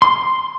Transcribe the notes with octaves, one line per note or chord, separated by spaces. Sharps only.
C6